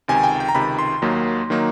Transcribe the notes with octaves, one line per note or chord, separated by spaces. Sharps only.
C#2 C3 D#3 G#5
G5
G5
A#5
C#2 C3 D#3 B5
C6
D#2 D#3 F#3 A#3 D#4
D#3 F#3 A#3 D#4